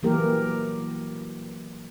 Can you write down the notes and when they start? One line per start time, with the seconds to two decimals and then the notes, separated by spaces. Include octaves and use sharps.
0.03 E3 F#3 A#3 G4 A#4